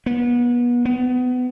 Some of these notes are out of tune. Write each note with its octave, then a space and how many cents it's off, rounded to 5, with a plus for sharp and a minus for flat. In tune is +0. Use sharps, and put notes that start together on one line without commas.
B3 -30
B3 +25